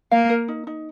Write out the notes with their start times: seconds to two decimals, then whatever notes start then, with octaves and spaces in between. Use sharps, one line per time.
0.11 A#3 F5
0.30 A#4
0.48 D#4
0.67 D#4